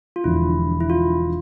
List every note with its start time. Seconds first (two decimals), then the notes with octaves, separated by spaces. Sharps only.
0.16 F4
0.24 E1 E2 D3 F3 E4
0.80 E4
0.90 F4